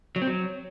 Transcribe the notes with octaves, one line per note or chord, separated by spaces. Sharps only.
F#3
C4
F#3